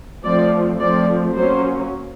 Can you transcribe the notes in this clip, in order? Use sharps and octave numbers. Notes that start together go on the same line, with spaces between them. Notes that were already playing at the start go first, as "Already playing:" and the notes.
F3 A3 C4 D5
F3 A3 C4 D5
F#3 A#3 C#4 C5